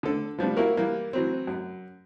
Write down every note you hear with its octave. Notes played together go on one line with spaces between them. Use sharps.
D3 A4
F3 G3 B3 D4
A#3 E4 F#4 A#4
E3 G3 A#3
E3 F#3 C4
F#2